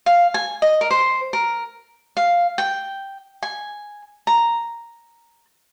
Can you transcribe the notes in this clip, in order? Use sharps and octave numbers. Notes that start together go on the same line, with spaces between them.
F5
G#5
D#5
A#4
C5
A#4
F5
G5
G#5
A#5